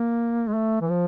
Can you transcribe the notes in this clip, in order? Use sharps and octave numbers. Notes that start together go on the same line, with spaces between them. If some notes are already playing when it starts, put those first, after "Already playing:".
Already playing: A#3
G#3
A3
E3
F3